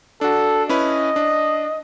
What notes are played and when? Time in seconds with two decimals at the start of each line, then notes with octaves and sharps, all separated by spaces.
0.21 D4 F#4 A4
0.69 C#4 E4 B4 D#5
1.16 D4